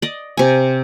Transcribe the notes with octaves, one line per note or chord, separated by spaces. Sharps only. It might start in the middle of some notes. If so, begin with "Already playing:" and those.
D5 D#5
C3 G#5